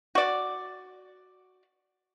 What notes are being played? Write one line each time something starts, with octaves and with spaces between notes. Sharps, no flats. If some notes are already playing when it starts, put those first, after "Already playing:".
F#4 D5